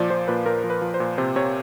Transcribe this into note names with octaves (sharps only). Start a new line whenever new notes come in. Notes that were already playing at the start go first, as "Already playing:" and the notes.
Already playing: A#2 F3 D5
F3 C5
A#2 B4
A#2 A#4
F3
B4
F3
C5
A#2
C3 C5
C3 C#5